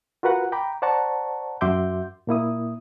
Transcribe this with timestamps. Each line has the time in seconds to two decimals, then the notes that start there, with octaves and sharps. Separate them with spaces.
0.23 F4 F#4 A#4 B4 F#5
0.52 G5 A#5 B5 D6
0.82 C5 D5 F#5 A5 A#5 C#6
1.61 F#2 F#4 E5 C6 D6 G6
2.27 A#2 A#3 E4 D#6